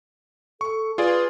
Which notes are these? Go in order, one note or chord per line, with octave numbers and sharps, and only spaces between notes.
A4 C#6
F4 G#4 B4 D5